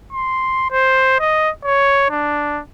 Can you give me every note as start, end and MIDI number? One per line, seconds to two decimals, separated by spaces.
0.13 0.68 84
0.71 1.17 72
1.20 1.50 75
1.64 2.06 73
2.10 2.61 62